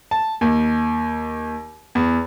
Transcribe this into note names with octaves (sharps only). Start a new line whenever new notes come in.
A5
D#2
E2